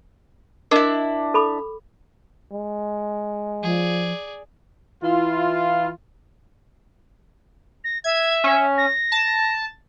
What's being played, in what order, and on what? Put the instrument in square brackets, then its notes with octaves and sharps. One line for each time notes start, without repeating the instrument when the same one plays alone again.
[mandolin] D4 E4 [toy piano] A#4 D#5
[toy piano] A4 B5 D6
[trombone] G#3
[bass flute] F3 [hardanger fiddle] G#4 D5
[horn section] E3 E4 F4
[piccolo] A#6
[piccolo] E5 [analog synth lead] G#6
[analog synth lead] C#4
[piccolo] A#6
[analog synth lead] A5